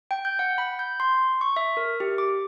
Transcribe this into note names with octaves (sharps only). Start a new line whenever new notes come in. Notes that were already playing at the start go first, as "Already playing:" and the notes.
G5
G6
F#5
B5
G6
C6
C#6
E5
A#4
G4
D6